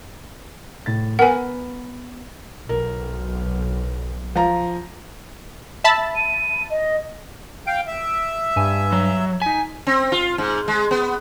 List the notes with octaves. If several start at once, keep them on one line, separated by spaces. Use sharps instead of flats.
A2 A6
B3 A#4 B4 F#5 G#5
B1 A#4
F3 A#5
E5 A5 B5
D#7
D#5
F5 G5 D7
E5
G2 G#5
F#3
D#4 G#5 B6
C4
F4
G#2
G#3
B3